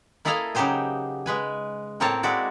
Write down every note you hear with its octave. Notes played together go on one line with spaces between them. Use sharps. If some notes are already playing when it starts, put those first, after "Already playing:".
A#3 E4 G#4 A4 D#5 F5
C#3 F#3 D#4 G4 C5 G#5
G#3 B4 G#5
A2 A#3 C4 A#4 C#5 A5
G#3 E4 F#4 D5